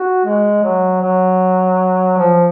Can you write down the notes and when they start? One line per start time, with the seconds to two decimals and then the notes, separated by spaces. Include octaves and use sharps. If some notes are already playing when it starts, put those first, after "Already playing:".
Already playing: F#4
0.25 G#3
0.63 F#3
1.01 F#3
2.17 F3